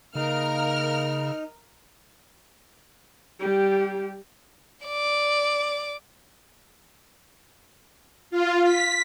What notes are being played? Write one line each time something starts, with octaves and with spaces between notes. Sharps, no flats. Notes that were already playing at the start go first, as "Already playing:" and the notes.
C#3 A#3 D#4 A#4 F6
G3 G4
D5 D6
F4
B6